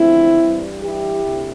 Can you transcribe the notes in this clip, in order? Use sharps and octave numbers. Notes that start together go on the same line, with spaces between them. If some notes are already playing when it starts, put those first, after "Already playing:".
Already playing: E2 D3 F3 A3 C4 E4
G2 E3 G3
E4 G4
D2 C3